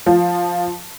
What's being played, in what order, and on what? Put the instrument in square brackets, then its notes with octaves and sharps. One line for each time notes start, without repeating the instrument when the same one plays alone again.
[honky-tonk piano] F3